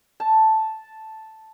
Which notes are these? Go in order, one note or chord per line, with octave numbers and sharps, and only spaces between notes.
A5